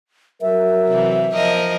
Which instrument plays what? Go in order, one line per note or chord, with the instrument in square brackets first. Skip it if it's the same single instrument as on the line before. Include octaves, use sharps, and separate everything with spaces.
[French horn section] F#3 A#4 [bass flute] E5
[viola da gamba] C3 E3
F3 A#4 D#5